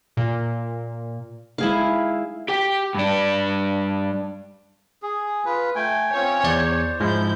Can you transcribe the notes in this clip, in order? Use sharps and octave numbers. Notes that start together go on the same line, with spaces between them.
A#2
G#3 D#4 E4 G#4 F5
G4 G5
G2 D4
G#4
F4 B4
A3 G5 G#5
C4 C#4 F4 C#5
E2 C5 D5 G#6
G#2 F3 G#3 E4 G6